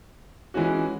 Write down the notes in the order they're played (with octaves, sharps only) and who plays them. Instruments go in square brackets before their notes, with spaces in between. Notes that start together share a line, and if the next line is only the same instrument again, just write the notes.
[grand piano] E3 G#3 C#4 F#4